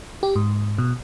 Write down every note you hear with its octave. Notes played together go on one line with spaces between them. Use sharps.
G4
G#2
B2